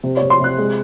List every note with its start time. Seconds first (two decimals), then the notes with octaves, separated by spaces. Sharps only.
0.03 C3
0.17 C#5
0.22 C3
0.30 C6
0.40 C3 F#6
0.58 G#3